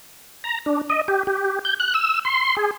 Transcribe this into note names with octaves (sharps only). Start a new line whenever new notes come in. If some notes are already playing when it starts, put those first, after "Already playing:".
A#5
D4
D#5
G4
G4
G6
F#6
E6
C6
G#4